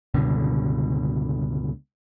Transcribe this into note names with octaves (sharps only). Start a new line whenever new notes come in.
C#2 G2 B2 D3